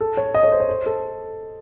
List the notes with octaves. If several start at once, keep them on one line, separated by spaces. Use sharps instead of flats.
A4
C#5
D#5
C#5
C5
C#5
C5
A4